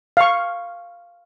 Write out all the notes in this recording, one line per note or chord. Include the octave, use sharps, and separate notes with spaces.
F5 C#6